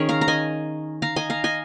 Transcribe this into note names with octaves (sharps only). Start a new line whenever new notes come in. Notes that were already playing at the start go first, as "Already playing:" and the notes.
Already playing: D#3 C#4 G#4 A#4 C#5
F5 A#5
A#5
D#5 G#5
F5 A#5
D#5 G#5
F5 A#5
D#5 G#5